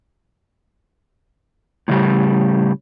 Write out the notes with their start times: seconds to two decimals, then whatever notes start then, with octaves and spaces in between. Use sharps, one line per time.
1.88 A2 C#3 G3